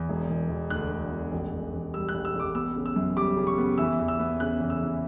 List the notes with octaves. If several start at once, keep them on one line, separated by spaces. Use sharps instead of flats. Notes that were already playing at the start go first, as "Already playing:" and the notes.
Already playing: E2
E1
E1
E1
D2 F#6
D2
E1
A1
A1
A1
G3 E6
F#6
A1
E6
A1 D6
B3 E6
C#3
E6
F#2
G3 D6
C#3
C#6
B3
E3 E6
E2
E6
B3
C#3 F#6
E2
E6
E3